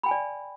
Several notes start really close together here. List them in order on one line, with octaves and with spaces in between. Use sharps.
B5 G5 G#5 D5